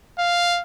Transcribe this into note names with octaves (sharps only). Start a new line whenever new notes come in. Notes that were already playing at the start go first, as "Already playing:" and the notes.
F5